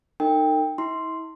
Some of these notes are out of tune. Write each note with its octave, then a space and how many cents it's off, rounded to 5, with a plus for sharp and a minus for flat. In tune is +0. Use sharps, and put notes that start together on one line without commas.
D#4 -20 A#4 -45 G5 +15
E4 -40 C6 +0